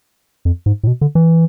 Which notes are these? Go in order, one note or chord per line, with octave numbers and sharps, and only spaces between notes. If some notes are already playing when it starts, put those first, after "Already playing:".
F2
G#2
A2
B2
D3
E3